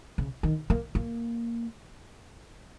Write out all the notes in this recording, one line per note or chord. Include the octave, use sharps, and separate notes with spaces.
C#3
D#3
A#3
A#3